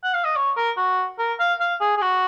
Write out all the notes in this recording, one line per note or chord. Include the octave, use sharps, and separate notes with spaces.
F#5
F5
D#5
C#5
A#4
F#4
A#4
F5
F5
G#4
G#4
F#4